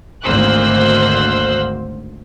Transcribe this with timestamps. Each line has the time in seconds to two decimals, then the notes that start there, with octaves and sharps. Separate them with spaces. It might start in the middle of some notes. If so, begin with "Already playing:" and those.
0.23 G#1 D2 A#3 C5 E6 F#6